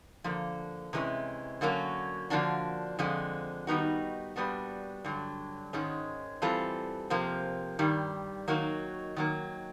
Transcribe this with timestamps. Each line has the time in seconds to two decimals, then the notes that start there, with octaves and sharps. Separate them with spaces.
0.24 D3 F3 A#3
0.93 C3 E3 G#3 C#4
1.61 D3 F#3 A#3 C#4 F#4
2.30 D3 F3 A#3 D4 F#4
2.99 F2 D3 F3 G#3
3.67 D#3 G3 B3 D#4 F#4
4.36 A#2 G3 B3 D4 F#4
5.05 G2 D3 F#3
5.73 G#2 D#3 G#3 C#4
6.42 E3 G3 C4 F4 A4
7.10 C3 F3 A#3
7.79 G2 D#3 G3
8.48 D#3 F#3 A#3 D#4 F#4
9.16 D#3 F#3 A#3